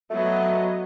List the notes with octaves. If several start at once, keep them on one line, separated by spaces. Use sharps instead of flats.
F#3 A3 B3 D#5